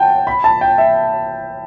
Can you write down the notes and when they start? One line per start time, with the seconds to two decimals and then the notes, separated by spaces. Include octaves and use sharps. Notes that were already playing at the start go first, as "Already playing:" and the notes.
Already playing: F#5 G5 A5
0.27 B5
0.44 A5
0.61 G5
0.78 E5